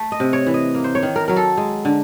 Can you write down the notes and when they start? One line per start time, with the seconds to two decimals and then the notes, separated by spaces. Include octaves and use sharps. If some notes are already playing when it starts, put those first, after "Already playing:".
Already playing: A3
0.12 D#5
0.20 C3
0.33 C#5
0.47 E3
0.54 D#5
0.74 A#3
0.84 C5
0.95 C#5
1.03 D#3
1.16 A#4
1.28 F#3 A#4
1.36 A4
1.57 G#3
1.85 D3